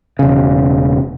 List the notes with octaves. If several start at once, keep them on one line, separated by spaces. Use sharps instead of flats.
E1 C#3